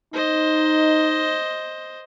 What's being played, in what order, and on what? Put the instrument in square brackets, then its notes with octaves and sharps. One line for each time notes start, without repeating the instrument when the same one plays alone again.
[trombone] D#4 [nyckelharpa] C5 D#5